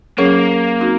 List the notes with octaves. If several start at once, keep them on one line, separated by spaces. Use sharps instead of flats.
F#3 A#3 C#4 G#4 C#5
C4 D#4 F#4